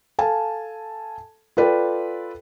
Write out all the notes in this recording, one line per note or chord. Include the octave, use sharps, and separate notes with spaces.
A4 F5 G#5 A5
F4 A4 B4 D5 G5